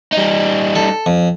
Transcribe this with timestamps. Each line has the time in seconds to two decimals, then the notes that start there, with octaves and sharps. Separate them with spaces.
0.12 G3 D#4
0.75 A4
1.06 F2